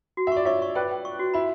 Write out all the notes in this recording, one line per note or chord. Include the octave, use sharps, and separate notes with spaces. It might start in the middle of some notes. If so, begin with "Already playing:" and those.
F#4
E5
D5 C#6
C#5 E5 C#6
C#6
B4 D5 G5
G5
C#6
F#4
E4 B5